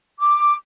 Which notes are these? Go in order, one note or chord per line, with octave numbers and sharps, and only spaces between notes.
D6